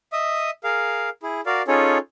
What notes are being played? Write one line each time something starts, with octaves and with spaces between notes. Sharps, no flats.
D#5 E5 D#6
G#4 A#4 F5
E4 G#4
F#4 A#4 D5 F5
C#4 D#4 F4 G#4 A4 C#5